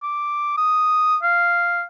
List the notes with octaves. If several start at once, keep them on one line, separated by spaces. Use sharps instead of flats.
D6
D#6
F5